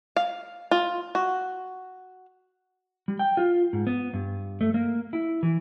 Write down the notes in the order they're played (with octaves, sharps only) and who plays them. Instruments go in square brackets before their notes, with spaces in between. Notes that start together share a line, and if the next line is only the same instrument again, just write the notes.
[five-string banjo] F5
F4
F#4
[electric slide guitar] G3
G5
F4
G#2
B3
G2
A3
A#3
E4
E3